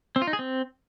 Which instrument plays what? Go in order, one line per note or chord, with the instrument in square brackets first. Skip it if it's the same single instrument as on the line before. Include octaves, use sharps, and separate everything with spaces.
[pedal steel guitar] C4
F4
D#4
G#4
C4